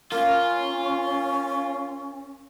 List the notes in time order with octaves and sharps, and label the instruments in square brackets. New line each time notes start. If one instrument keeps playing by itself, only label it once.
[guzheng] A#3 [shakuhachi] C#4 [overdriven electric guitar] F4